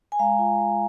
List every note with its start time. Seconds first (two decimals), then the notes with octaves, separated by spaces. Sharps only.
0.12 G#5
0.19 G#3 F5 A#5
0.39 F4
0.59 G#3